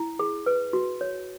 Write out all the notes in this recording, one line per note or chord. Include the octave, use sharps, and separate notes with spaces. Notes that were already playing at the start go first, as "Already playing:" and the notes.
Already playing: E4
G#4
B4
F#4
C#5